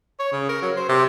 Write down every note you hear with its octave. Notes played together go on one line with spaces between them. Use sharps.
C#5
C#3
A#4
F#3
C5
C3